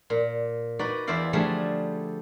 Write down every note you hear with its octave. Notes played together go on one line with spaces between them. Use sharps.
A#2
D#4 F#4 B4 D5
E2 E4 C5 D5 F5
D3 F3 G3 A3 G#4 D5